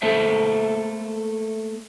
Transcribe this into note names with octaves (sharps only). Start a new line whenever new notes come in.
A3 A#3 A4 C5 E5